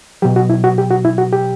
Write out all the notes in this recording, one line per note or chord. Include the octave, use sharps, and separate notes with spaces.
B2 F#3 G4
F#4
E4
F#4
G4
F#4
E4
F#4
G4